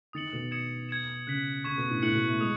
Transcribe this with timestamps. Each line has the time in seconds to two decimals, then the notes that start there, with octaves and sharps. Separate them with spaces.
0.13 D#3 D#6 A6 C#7 F#7
0.33 B2
0.51 D#6 G#6 C#7 E7
0.89 G#6 C#7 E7
1.27 C#3 F#6 B6 F#7
1.64 C#3 C#6 G#6 B6 E7
1.78 B2
1.90 A2
2.02 A2 F#6 C#7 F#7
2.15 B2
2.27 A3
2.40 G#3 D#6